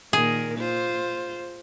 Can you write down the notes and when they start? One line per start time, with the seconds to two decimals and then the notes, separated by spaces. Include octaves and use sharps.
0.13 A#2 D#3 G#4 A#4
0.59 F4 C5